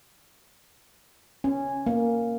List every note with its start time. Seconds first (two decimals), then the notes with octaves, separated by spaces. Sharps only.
1.44 C#4
1.86 A#3